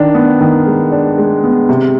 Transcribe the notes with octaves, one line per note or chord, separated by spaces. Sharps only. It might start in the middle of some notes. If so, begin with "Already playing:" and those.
Already playing: D#3 D4
B3
D#3
G#3
D4
G#3
B3
C3